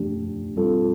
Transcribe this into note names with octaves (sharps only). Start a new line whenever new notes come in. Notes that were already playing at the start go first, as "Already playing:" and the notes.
Already playing: F3 A3 D4 G4
G3 C4 F4 A4